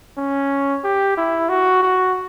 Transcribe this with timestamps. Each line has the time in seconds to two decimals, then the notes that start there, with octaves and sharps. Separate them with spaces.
0.17 C#4
0.84 G4
1.17 E4
1.49 F#4
1.83 F#4